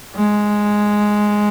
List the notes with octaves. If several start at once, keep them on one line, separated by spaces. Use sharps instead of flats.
G#3